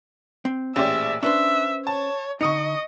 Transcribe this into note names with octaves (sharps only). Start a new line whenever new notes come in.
C4
A1 A#2 G4 G#4 C5 D5 E5
C#4 D4 B4 C5 E5
C#5 A5
D3 D#4 D#5 C#6 D#6 C#7